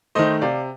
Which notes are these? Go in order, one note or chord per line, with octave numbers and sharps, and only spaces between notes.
D#3 A3 C5 D#5
C3 D5 F5